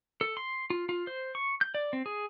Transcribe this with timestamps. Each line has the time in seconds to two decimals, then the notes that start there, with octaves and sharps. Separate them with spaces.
0.21 A4
0.37 C6
0.70 F4
0.89 F4
1.07 C5
1.35 C#6
1.61 G6
1.75 D5
1.93 C4
2.06 G#4